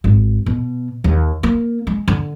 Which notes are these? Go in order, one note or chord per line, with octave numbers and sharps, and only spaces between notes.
G#1
B2
D#2
A#3
G#3
D3